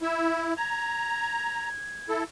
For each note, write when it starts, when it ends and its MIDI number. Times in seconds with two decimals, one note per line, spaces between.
0.02 0.54 64
0.02 0.41 76
0.57 1.69 82
0.57 2.09 92
2.09 2.24 64
2.09 2.24 69